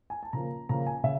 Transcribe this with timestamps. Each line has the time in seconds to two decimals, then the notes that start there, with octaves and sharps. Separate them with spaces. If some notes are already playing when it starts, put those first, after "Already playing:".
0.10 G#5
0.23 A5
0.33 C#3 F3 A#3 A#5
0.69 C#3 F3 A#3 A#5
0.87 G#5
1.04 C#3 E5